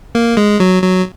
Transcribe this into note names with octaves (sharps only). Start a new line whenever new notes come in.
A#3
G#3
F#3
F#3